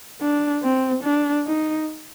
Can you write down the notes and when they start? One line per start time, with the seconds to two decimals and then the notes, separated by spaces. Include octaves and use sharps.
0.21 D4
0.62 C4
1.03 D4
1.46 D#4